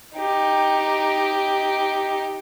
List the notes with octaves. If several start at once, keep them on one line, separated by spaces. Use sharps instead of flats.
D#4 G4